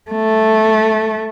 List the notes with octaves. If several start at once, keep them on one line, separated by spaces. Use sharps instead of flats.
A3